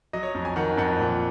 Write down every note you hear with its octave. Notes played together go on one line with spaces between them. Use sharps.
F#3 D#5
C#5
F2
G#5
D#3 F#5
F2 F#5
A#2